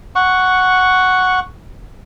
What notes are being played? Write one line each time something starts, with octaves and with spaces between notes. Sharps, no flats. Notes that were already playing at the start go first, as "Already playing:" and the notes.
F#5 C#6